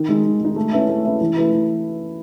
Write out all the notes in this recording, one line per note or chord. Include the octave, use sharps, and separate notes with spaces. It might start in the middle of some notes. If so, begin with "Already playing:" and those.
Already playing: D#3
G#3 D#4
D#3
G#3 D#4
A3
C#4 E4 B4 E5
A3
C#4 E4 B4 E5
E3
A3 E4 B4
E3